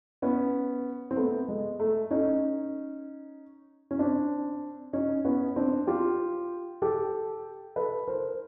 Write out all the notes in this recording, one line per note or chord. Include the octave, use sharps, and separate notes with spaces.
B3 C#4
C4
A3 B3
G#3
A3
C#4 D#4
C#4
C4 D4
C#4 D#4
B3 C#4
C4 D4
F4 G4
G4 A4
A4 B4
A#4 C5